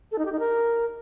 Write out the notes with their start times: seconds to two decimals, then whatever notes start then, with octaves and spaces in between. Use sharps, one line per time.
0.12 A4
0.19 D#4
0.25 G4
0.32 D#4
0.39 A#4